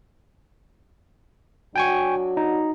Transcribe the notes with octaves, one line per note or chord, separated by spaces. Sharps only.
F#3 D4 F#4 G5 G#5 C#6
D#4